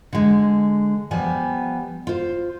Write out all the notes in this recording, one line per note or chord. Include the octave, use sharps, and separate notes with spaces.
D3 G#3
F3 G3 B3 G#5
F4 C5